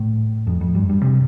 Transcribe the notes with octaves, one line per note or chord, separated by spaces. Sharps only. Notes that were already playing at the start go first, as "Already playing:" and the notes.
Already playing: A2
F2
F2
G2
G2
C3